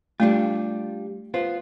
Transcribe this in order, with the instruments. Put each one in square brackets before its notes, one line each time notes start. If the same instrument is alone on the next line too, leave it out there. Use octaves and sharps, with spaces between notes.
[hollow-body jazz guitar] G3 D4 F4 [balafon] A3
[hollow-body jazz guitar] B3 F4 C5